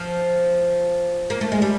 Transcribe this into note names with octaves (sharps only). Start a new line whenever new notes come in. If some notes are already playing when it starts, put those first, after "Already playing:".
Already playing: F3
A#3
A3
G#3
G3